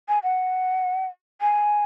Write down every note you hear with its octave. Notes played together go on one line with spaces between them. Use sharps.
G#5
F#5
G#5